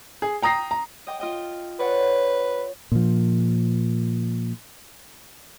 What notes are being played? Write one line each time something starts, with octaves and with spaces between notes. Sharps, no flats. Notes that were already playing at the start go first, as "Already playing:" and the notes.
G#4
G5 A#5 D#6 A#6 C7
A#5
D#5 G5 D6
F4 D#5 G5
B4 C#5 D5 F#5
A#2 F3